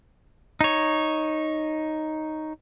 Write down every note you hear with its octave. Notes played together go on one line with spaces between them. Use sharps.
D#4 C#5